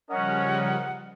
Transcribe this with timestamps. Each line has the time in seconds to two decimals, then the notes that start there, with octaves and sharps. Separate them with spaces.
0.10 C#3 F3 G3 C#4 A#4 D#5 F#5